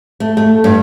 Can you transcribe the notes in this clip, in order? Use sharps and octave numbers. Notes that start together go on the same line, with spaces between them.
A3
A3
G2